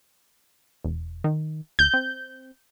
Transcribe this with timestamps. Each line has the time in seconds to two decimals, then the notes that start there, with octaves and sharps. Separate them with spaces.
0.84 E1
1.24 D#3
1.79 D1 G6
1.94 C4